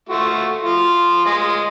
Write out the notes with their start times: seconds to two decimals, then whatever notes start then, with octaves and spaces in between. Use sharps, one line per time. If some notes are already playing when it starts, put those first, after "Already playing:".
0.09 A3 F4 F#4
0.63 F3 F4
1.25 G#3 F4